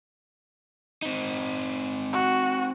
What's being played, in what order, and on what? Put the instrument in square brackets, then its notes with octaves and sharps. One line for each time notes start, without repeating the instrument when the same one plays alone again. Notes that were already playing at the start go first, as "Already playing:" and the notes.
[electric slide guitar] C4 D#4
[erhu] F#4